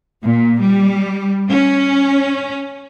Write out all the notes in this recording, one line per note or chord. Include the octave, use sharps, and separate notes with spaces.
A#2
G3
C#4